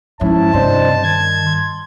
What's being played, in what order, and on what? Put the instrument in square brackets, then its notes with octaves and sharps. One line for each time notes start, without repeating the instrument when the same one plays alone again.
[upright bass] G#2 [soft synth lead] F3 [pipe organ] C#4 E4 [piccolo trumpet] A5
[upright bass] G2 [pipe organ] C3 D4 C5 [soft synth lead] D#5
[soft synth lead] D#3 [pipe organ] G#6
[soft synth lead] C6